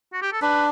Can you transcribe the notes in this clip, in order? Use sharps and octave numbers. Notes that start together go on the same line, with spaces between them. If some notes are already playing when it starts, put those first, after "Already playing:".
F#4
G4
A4
D4 B4